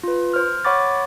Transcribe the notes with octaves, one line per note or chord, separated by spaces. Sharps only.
F4 B4
C5 F6
C#5 F#5 B5 C#6 D6 A6